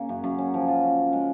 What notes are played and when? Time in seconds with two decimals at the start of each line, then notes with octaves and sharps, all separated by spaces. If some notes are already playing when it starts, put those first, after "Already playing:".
Already playing: C#3 A#3
0.09 F#2
0.24 F#2
0.38 C#4
0.54 F3
0.68 F4
0.83 C#4
0.99 C#4
1.13 G#3